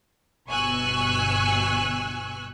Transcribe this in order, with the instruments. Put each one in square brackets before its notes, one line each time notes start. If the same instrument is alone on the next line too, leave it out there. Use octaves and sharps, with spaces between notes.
[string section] G1 B2 G#5 C#6 E6 F#6